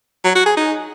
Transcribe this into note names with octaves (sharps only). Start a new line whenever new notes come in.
F#3
F#4
G#4
D#4